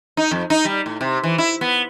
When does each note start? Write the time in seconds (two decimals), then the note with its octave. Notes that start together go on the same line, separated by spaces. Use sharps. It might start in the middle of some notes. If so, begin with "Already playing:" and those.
0.17 D#4
0.31 F2
0.50 D#4
0.65 G3
0.86 A2
1.01 C3
1.24 E3
1.38 E4
1.61 B3